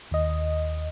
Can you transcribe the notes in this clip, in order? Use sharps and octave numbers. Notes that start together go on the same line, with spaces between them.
D#2 D#5